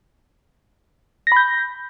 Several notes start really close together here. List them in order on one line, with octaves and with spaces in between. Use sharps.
A#6 B5 G6